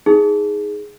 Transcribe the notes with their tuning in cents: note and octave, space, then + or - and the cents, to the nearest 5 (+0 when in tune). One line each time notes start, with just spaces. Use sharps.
D#4 +20 G#4 +0